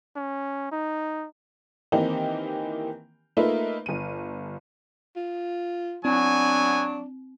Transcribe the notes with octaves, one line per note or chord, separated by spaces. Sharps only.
C#4
D#4
D#3 E3 A#3 C4 D#4 G4
A3 A#3 D#4 F4 B4 E5
G1 D#7
F4
F#3 B3 C4 D4 G#5